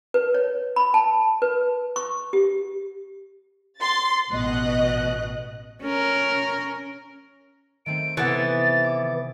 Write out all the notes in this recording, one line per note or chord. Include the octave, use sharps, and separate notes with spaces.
B4
C#5
B5
A5
B4
C#6
G4
C6 A6
A1 B2 D#5 F#6
C#4 A#4
D#3 A3 C4 D7
C3 E3 B3 A4 A6
D6